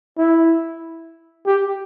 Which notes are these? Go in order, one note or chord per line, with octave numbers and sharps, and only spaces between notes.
E4
G4